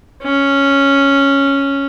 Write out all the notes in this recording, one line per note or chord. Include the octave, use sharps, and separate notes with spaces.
C#4